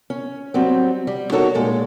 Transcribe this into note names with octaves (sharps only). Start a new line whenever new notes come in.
C#4
F#3 G3 C4
G3
D#4 F#4 A4 A#4 C#5
A#2 G#3 A4